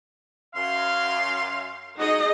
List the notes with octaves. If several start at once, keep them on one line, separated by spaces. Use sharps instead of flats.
F#2 F5 C6
D#4 F#4 G#4 D#5